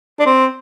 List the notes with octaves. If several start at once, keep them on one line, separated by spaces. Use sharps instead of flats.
D4
C4